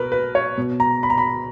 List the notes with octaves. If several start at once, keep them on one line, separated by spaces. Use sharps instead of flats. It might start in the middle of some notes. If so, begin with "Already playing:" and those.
Already playing: B2 A#4 B4
B4
C#5
B2
A#5
B5
A#5
B5